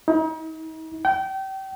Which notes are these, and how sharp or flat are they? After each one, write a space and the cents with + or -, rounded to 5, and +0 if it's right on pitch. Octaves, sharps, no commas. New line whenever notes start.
D#4 +40
G5 -30